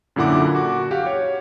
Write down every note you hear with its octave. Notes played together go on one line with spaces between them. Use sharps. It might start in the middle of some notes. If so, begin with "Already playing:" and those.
F#2 A#2 D3 E4 F#5 D6
F#4 D6
G4 F5 F#5
C#5